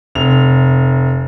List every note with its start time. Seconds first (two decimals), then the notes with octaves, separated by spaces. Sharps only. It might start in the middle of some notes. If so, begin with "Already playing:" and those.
0.15 F1 F7